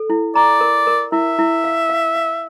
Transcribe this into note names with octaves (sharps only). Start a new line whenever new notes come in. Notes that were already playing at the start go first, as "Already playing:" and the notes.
Already playing: A4
E4
D5 A#5
A#4
A#4
E4 E5
E4
F5
F5
F5